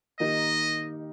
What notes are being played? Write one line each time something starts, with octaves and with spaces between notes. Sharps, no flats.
D#3 A#3 D#4 G4 D#5